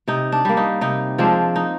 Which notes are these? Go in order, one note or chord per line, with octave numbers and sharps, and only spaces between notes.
C3 D#4
D4
G3 A#3
D#4
C3 D#4
F3 G#3 C4 D4
D#4